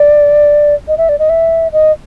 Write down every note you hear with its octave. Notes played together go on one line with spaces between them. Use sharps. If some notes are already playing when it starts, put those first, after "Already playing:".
Already playing: D5
D#5
E5
D5
D#5
E5
D#5